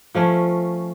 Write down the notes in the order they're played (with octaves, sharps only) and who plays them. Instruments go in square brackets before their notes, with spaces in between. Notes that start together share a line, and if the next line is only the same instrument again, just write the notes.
[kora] F3 A3 C#4